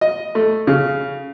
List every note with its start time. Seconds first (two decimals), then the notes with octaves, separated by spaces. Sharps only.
0.01 D#5
0.35 A3
0.67 C#3